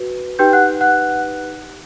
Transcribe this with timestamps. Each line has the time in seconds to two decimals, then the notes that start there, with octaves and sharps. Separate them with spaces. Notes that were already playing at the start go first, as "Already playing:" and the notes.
Already playing: F#4 B4
0.39 D#4 G4 B4 G5 G6
0.53 F#5 F#6
0.81 F#5 F#6